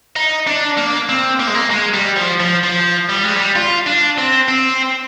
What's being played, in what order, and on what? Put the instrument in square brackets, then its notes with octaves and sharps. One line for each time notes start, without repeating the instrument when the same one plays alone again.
[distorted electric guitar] D#4
D4
A#3
C4
A#3
G#3
A#3
G#3
G3
F3
F3
F3
G3
G#3
G3
F4
D4
C4
C4